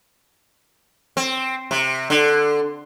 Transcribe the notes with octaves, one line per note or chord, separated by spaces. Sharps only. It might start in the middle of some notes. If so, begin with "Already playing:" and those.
C4
C3
D3